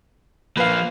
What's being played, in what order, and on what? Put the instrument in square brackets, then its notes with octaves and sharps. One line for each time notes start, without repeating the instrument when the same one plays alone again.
[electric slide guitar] F3 A#3 [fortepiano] B4 F5